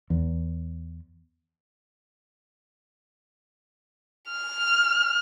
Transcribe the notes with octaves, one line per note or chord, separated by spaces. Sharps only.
E2
F6